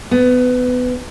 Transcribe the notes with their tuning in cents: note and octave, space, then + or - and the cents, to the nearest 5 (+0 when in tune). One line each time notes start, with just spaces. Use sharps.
B3 +20